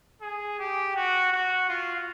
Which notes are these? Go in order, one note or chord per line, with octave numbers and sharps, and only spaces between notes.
G#4
G4
F#4
F#4
F4